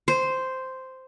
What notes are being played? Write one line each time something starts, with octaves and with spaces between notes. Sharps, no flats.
C5